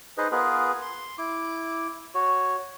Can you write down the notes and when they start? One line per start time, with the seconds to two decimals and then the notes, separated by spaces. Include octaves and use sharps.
0.18 D#4 G#4 B4 C5 D#5
0.32 B3 F4 G#4 A#4 B4
0.82 C6
1.18 E4 D6
2.15 F#4 C#5